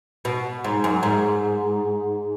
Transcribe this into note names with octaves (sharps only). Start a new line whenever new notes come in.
B2
G#2
F#2
G#2